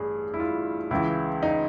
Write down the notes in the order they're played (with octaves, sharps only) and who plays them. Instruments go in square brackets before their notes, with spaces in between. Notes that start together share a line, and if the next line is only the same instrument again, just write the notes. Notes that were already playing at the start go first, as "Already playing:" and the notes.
Already playing: [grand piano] A1 G2 G#4
E4
F4
C#2 C#3 E3 E4
D#4